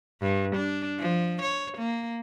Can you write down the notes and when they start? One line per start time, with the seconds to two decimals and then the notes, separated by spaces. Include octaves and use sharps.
0.21 G2
0.56 D4
0.99 F3
1.42 C#5
1.78 A#3